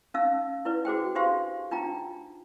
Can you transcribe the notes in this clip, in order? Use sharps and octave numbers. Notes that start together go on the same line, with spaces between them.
C#4 D#4 F5 E6
E4 B4 D5
F#4 G#4 C5 G5
D4 G4 C5 F5 C6
D4 D#4 F4 G5 A#5